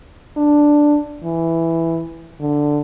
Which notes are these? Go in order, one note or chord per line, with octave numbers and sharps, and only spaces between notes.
D4
E3
D3